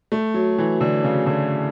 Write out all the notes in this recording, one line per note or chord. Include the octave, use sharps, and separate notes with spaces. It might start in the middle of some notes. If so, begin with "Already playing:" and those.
A3
F#3
E3
D3
C#3
D3